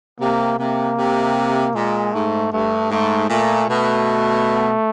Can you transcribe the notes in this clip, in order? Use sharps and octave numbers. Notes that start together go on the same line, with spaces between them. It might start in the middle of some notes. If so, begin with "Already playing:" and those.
C3 A#3
C3 A#3
C3
A#2 G#3
G#2 A3
G2 A3
G#2 A3
A#2 A3
B2 A3